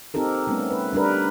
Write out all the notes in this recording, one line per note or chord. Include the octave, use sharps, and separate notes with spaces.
C4 D#4 G4 A4 A#4
G3 A3 B3 C#4
B4
G3 D4 A#4 B4